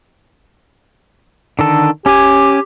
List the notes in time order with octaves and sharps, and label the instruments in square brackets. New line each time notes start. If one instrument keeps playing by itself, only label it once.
[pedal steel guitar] D3 D#3 A4
[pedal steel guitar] C#4 G#5 [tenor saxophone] G4